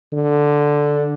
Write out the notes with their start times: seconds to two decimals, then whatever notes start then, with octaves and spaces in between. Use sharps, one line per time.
0.13 D3